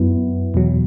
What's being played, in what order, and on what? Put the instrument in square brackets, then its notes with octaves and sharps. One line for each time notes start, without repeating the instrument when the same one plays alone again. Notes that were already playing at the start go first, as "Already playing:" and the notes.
Already playing: [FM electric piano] F#2 F#3 B3 E4
E2 B2 F#3